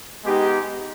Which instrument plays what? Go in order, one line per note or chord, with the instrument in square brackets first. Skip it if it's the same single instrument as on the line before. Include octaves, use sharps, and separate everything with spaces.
[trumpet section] G#3 B3 D#4 G4